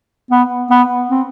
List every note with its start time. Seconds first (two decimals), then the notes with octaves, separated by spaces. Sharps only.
0.31 B3
0.71 B3
1.10 C4